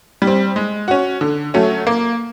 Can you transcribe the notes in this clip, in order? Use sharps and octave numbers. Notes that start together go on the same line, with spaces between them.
G3
C4
G#3
C#4 F#4
D3
F#3 A3 C#4
A#3